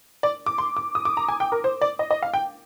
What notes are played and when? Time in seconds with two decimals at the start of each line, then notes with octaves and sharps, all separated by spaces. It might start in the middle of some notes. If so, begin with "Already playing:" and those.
0.23 D5
0.46 D6
0.58 C6
0.77 D6
0.95 D#6
1.05 D6
1.17 A#5
1.28 G#5
1.40 G5
1.52 A#4
1.64 C5
1.81 D5
1.99 D#5
2.11 D#5
2.23 F5
2.34 G5